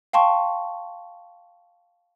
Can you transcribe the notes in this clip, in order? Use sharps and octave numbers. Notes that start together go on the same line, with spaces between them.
F5 G5 A5 C6 C#6